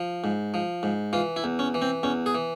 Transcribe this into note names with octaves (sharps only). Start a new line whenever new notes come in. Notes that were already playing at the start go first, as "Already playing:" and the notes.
Already playing: F3
G#2
F3
G#2
E3 F4
E4
E2
C#4
E3
C4
E2 C#4
G#4
E3